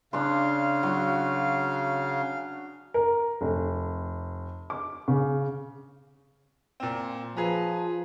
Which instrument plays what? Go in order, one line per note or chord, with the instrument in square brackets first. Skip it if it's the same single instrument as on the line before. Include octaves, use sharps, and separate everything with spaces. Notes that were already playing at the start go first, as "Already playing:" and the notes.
[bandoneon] C#3 [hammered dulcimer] D4 C6 [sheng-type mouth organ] F5
[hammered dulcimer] F#3 F#4
[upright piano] A#4
F1
D6
C#3
[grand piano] A#2 C4
[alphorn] F3 [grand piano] G#4 B4 A#5